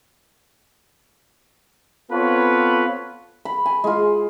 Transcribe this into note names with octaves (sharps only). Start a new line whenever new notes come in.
B3 C4 F4 A4 B4 C#5
B5
G#5
G#3 F4